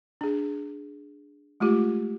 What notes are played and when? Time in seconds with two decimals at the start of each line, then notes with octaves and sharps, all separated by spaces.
0.21 D4 G#4
1.60 G#3 A3 F4 G4